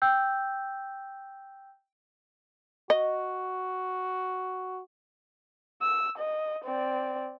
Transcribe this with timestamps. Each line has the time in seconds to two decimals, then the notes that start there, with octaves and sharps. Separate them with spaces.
0.02 G5 E6 G6
2.90 F#4 D#5
5.82 E6
6.18 D#5
6.65 C4 D5